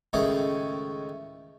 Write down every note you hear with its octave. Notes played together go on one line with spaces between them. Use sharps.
C#2 A2 D#3 C#4 G#4